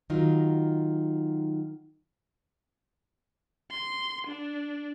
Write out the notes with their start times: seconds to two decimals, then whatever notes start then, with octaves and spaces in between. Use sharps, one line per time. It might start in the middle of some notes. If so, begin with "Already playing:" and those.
0.10 D#3 F#3 D#4 F4
3.71 C6
4.27 D4